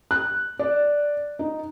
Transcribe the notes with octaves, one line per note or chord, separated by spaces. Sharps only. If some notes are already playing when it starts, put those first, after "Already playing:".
F#6
D5
D#4